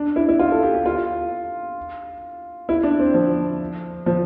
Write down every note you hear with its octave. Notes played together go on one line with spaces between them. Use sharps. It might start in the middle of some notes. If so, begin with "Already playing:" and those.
Already playing: D4
E4
E4
F4
A4
G4
G4
F4
E4
D4
C4
F3
F3